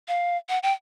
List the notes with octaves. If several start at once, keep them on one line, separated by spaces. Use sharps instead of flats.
F5
F#5
G5